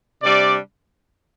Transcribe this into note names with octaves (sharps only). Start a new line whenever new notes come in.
C3 G3 D4 D5